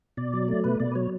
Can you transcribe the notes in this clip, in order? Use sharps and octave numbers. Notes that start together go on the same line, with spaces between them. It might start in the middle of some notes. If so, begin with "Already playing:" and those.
B2 D5
F#3
A3
B2 B4
B2 D5
B4
F#3 C#5